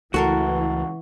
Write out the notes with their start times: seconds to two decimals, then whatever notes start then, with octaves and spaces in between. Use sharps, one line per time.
0.14 C#2 E3 A3 F#4 A4 A#4 F#5 C#6